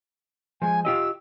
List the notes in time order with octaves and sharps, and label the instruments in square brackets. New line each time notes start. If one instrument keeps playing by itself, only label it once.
[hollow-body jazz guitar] F3 G#3 [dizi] G#5
[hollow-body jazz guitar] F4 G4 D#5 [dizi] E6